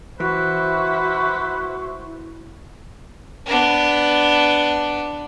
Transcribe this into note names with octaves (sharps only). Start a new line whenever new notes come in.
E3 E4 F#4 B4 C5
B3 D4